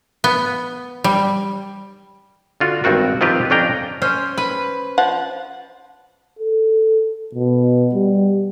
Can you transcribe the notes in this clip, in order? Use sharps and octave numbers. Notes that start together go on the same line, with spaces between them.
B3
G3
D3 F4 F#4
G#1 G2 C4 F#4 A#4
D#3 F3 C4 F4 G4 B4
F2 C#4 D4 G5 A#5
C#4 C5
B4
F3 F#5
A4
B2
G3